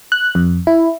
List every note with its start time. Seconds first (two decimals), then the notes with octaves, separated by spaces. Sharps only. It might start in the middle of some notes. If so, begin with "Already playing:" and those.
0.12 F#6
0.35 F2
0.67 E4